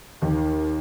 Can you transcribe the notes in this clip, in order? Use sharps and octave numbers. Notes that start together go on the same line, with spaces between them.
D#2 D#3